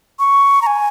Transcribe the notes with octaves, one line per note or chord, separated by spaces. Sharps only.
C#6
A#5
G#5